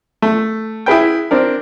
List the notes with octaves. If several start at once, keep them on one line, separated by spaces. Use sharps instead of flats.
A3
E4 G#4 B4 G5
C4 D4 A#4